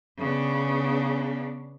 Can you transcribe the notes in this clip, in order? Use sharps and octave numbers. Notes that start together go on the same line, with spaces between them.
C#3 B3 D4